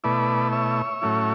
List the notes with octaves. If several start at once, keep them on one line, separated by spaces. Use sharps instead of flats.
B2 A3 E4 B4 D5
C#5 E5
A2 F#3 A3 C#4 E4